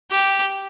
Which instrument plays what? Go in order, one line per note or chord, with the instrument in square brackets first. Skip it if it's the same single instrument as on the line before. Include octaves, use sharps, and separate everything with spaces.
[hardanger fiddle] G4